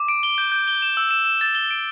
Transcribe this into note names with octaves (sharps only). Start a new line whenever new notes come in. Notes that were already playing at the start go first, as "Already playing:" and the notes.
Already playing: D6
D7
G7
G6
G6
G7
E7
E6
E7
E7
A6
G7
D7